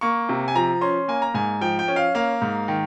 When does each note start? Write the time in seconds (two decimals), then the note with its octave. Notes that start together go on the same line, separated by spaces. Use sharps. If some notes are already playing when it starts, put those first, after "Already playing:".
0.01 A#3 C#6
0.29 C3
0.48 G#5
0.55 F3 A#5
0.81 C#4 C6
1.08 A#3 G#5
1.22 A#5
1.34 G#2 G#5
1.61 F3 G5
1.79 G5
1.88 C#4
1.96 F5
2.15 A#3 F5
2.42 G#2
2.68 D#3